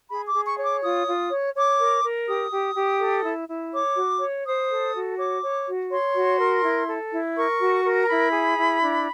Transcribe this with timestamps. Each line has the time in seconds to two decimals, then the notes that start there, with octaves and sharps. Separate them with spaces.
0.09 G#4 B5
0.27 D6
0.34 G#4
0.46 C#6
0.57 C#5
0.63 D6
0.81 F4 D#6
1.06 F4
1.31 C#5
1.54 C#5 D6
1.80 A#4
2.03 A#4
2.27 G4 D#6
2.52 G4
2.76 G4
3.00 A4
3.25 E4
3.49 E4
3.73 C#5 D6
3.96 F#4
4.21 C#5
4.46 C5 D#6
4.70 A4
4.93 F#4
5.18 C#5 D6
5.42 C#5
5.66 F#4
5.90 C#5 C6
6.14 F#4
6.38 A#4
6.64 E4
6.87 A4
7.12 E4
7.36 A#4 C#6
7.60 F#4
7.85 A#4
8.01 A#5
8.09 E4 B5
8.33 G#4
8.57 E4
8.82 D4